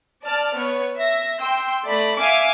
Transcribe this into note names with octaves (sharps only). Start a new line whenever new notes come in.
D5 A5 F6
B3 C#5
E5 A#6
G5 C6 E6
A3 D5 B5
E5 F5 G#5 D6